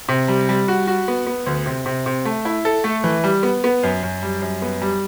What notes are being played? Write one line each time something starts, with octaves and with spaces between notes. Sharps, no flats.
C3
G3
G3
F#4
F#4
B3
B3
D2
C3
C3
C3
A3
E4
A4
A3
E3
G3
B3
B3
F#2
F#2
G3
F#2
B3
G3